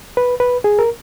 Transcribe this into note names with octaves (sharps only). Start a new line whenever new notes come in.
B4
B4
G#4
A#4